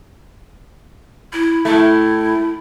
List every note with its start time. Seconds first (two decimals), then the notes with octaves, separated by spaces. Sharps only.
1.33 E4
1.65 A2 A3 E4